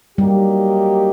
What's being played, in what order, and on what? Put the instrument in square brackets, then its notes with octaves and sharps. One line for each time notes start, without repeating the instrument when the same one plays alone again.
[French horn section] F#3 A#3 D#4 G4 [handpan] G3